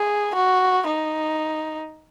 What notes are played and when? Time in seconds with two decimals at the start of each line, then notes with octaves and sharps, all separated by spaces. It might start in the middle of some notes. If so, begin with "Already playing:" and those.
Already playing: G#4
0.35 F#4
0.86 D#4